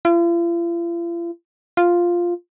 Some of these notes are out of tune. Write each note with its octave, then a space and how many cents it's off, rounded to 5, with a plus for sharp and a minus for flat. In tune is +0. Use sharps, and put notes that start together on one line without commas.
F4 -45
F4 +0